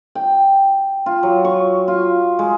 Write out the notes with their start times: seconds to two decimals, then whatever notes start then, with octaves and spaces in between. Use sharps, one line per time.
0.15 G5
1.06 F4
1.23 F#3
1.45 C#6
1.88 F4
2.39 G#3